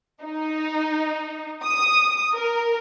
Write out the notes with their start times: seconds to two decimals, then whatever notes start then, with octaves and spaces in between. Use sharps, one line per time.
0.23 D#4
1.63 D#6
2.34 A#4